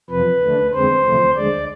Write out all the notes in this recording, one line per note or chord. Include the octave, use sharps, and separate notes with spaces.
F2 C3 F3 B4
D2 D3 A3 D4
F2 D3 G#3 C4 C5
D2 C3 F3 A3
D2 D3 G#3 D5